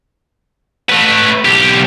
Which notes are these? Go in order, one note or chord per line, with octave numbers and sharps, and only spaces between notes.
A3 B4
B1 G4